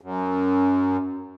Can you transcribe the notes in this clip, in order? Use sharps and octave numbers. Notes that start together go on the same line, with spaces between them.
F#2